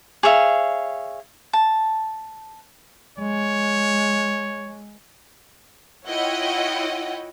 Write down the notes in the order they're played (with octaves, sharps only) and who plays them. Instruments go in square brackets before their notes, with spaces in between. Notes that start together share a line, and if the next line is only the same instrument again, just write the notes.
[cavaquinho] G#4 C#5 E5 F5
A5
[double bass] G#3 [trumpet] C#5
[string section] E4 F4 C#5 D#5 F#5 G5